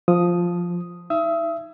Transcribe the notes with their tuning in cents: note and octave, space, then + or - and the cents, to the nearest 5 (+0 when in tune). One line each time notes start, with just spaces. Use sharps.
F3 +0 D#6 +0
D#4 +25 E5 +30 D#6 +35